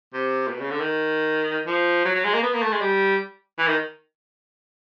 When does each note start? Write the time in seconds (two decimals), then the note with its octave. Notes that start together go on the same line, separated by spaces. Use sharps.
0.13 C3
0.47 A#2
0.51 B2
0.61 C#3
0.71 D3
0.80 D#3
1.66 F3
2.05 F#3
2.15 F#3
2.24 G#3
2.34 A#3
2.43 B3
2.53 A#3
2.62 A3
2.72 G#3
2.81 G3
3.58 E3
3.67 D#3